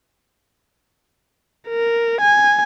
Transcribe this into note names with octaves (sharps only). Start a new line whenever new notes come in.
A#4
G#5